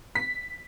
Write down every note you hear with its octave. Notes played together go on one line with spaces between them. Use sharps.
B6